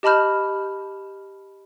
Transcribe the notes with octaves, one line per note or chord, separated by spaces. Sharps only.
G4 D#5 A5 B5 F6 G6